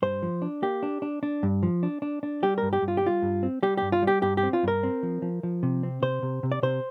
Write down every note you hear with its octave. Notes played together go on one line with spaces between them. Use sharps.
G2 C5
F3
D4
A#3 G4
D4
D4
D4
G2
F3
D4
D4
D4
G3 G4
G2 A#4
G4
G2
F4
G4
G3 F4
G2
C4
G3 G4
G2 G4
F4
G3 G4
G2 G4
G4
C4
F4
G2 A#4
C4
F3
F3
F3
C3
C4
C3 C5
C3
C3
D5
C3 C5